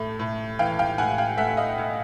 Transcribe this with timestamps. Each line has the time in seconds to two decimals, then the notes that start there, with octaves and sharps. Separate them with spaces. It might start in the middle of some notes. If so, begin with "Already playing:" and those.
Already playing: A2 A3
0.19 A2
0.59 E3 F5 G5
0.79 F5 G5
0.98 A2 F#5 G#5
1.18 F5 G5
1.37 A3 E5 F#5
1.57 D#5 F5
1.77 A2